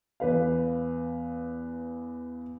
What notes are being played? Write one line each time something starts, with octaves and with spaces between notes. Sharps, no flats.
E2 B4 F5